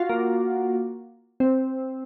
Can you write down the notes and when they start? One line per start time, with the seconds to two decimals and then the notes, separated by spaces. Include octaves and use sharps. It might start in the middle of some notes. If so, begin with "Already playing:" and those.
Already playing: F4 F#4
0.09 A#3
1.40 C4